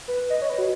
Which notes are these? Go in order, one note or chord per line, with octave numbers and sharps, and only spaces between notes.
B4
D#5
C#5
B4
F#4